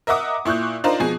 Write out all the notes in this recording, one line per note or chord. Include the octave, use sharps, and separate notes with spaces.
A#4 D#5 E5 F#5 D6 D#6
A#2 E4 C#6 F#6 G6
D4 D#4 F4 A#4 C5
B2 F3 G#4